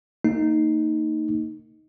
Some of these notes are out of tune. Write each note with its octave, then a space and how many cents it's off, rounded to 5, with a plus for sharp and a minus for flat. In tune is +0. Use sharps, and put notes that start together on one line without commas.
A#3 -30 D#4 +0